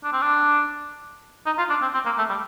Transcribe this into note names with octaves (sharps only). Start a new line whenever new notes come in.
D4
C4
D4
D#4
F4
D4
C4
C4
A#3
A3
G3